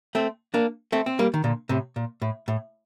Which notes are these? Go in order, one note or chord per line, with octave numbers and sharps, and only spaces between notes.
A3 C4
A#3 D4
A3 C4
C4
G3 A#3
D#3
A#2 D3
A2 C3
A#2
A2
A2